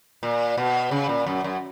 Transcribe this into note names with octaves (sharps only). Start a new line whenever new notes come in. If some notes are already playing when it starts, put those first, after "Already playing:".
A#2
B2
C#3
A#2
F#2
F#2